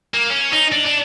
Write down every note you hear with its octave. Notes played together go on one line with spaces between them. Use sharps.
A#3
C#4
D#4
D4
D4